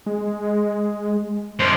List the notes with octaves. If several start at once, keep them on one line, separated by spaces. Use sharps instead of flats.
G#3
F#2 C5